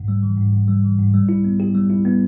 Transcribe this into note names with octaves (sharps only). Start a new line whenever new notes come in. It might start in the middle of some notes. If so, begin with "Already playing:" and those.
Already playing: G#2
G3
E3
G#2
G#2
G3
E3
G#2
G3
E4
B3
G4
G3
E4
B3